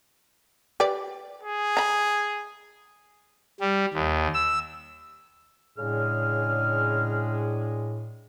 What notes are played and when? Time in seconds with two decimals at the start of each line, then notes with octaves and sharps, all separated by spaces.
0.80 G4 B4 D5
1.43 G#4
1.77 A#5 B5
3.61 G3
3.94 D#2
4.34 E6
5.78 A2 C#3 G#3 D4 G#4 F6